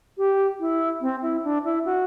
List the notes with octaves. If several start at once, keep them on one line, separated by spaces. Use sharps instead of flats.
G4
E4
C4
E4
D4
E4
F#4